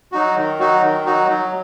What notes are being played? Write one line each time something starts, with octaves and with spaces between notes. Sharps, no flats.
F#3 D#4 F#4
D#3
F#3 D#4 F#4
D#3
F#3 D#4 F#4
F#3